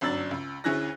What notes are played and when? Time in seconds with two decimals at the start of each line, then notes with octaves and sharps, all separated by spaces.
0.01 G1 F#2 D4 E6 A6 F#7
0.31 C#2
0.64 D2 C#4 E4 G#4 F#6 A#6